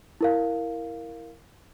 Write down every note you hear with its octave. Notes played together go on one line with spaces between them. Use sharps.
E4 A#4 F5